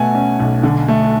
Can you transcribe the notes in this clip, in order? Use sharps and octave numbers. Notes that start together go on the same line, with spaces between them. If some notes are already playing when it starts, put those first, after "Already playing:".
Already playing: B2 A3 F#5 G#5
C#4
B1
D3
A3